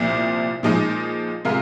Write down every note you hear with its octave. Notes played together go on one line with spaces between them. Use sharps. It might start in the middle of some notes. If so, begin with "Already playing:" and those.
Already playing: C2 A#2 F3 C4
A#2 F3 G#3 D#4
C3 G#3 F4 A#4